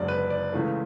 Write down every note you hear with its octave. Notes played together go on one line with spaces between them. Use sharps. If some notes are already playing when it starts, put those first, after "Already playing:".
Already playing: F#1 F#2 D3 G#3 D5
B4
D5
C#2 C#3 E3 A3